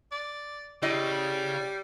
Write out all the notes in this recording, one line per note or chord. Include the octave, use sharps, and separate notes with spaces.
D5
C#3 G3 E4 D#5